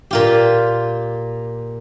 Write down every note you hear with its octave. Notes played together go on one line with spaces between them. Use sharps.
A#2 F4 G4